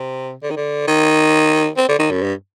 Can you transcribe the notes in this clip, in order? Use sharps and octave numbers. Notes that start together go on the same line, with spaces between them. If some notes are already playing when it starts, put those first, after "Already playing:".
Already playing: C3
D3
D#3
D3
D#3
C4
D3
D#3
F#2
G2